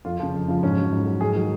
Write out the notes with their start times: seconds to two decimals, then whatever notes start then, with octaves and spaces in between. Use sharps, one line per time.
0.05 F2 F4
0.20 C#3 F3
0.34 F2
0.48 C#3 F3
0.63 G#2 C#4
0.77 F#3
0.92 G#2
1.06 F#3
1.21 G#2 G#4
1.35 D#3 F#3